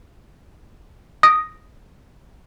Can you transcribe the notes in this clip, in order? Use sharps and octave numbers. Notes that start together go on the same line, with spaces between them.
D#6 A#6 D7